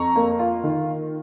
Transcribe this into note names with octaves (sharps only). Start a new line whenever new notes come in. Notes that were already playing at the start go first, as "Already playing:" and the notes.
Already playing: F2 A#5 C#6
A#3
F4
D#3